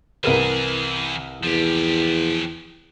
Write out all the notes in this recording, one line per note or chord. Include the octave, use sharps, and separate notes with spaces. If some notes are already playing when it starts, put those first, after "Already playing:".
C2 E3 G#4 A#4 B4
E2 F3 G4